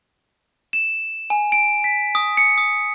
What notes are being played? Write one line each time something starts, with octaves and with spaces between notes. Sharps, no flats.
E7
G#5
D7
B6
D#6
C#7
D#6